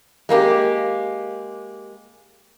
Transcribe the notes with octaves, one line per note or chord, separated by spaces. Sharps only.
G#3 A#3 D#4 G4